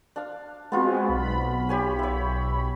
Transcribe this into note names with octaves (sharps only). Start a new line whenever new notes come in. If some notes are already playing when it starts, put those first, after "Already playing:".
D4 F5
G#3 B3 C4 F4 F#4
B1 B5
G4 C#5 G#5
C#5 E5